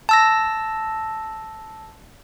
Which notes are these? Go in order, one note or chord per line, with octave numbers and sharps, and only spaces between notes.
A5 E6 A#6